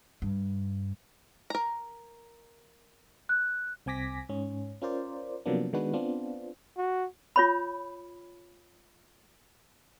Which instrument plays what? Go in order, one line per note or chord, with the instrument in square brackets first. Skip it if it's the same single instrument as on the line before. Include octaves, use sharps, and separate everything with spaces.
[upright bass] G2
[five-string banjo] A#4 A#5
[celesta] F#6
[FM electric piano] C2 C4 G#5 D6 A#6 B6
G#2 C#4
C#4 F4 A#4 C5 D5
C3 F3 F#3 A#3 B3 D4
D#3 G#3 B3 D4 F#4 B4
B3 C4 D4 F4
[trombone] F#4
[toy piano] F4 C#5 B5